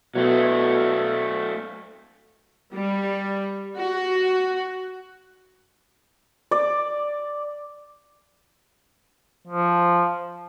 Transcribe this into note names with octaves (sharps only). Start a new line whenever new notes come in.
B2 F#3 A3
G3
F#4
D5
F3